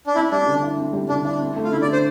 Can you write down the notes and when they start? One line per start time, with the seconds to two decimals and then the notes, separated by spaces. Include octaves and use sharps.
0.07 D4
0.15 C4 E4
0.31 G3 D4
0.47 D3
0.63 E4
0.78 C4
0.93 G3
1.09 D3 D4
1.25 D4 E4
1.40 C4
1.56 A3
1.64 F4
1.72 D3 E4
1.82 D5
1.87 D3
1.92 C5